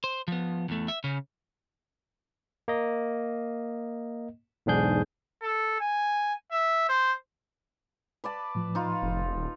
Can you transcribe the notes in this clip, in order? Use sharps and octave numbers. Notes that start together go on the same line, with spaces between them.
C5
F3 B3
E2 A3
E5
C#3 C#4
A#3 D#5
B1 E2 G#2 D4 G#4 G6
A4
G#5
E5
C5
B4 D5 A5
A2 F3
D#4 F4
F1
D#1